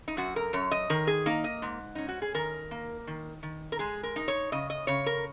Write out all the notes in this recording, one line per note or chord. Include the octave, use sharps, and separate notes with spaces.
D#4
F#2 F#4
A#4
F#2 C#5
D#5
D#3 A#4
G#4
A#3 D#4
D#5
G#2
C#4 D#4
F#4
G#4
D#3 A#4
A#3
D#3
D#3
A#4
G#3 G#4
A#4
D#4
C#5
C#3 D#5
D#5
C#3 C#5
A#4